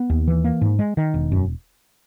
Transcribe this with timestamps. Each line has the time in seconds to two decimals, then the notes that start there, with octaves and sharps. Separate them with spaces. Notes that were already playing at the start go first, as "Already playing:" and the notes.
Already playing: B3
0.10 D#2
0.28 E3
0.44 A#3
0.61 G#2
0.79 G#3
0.97 D#3
1.14 E1
1.32 F#2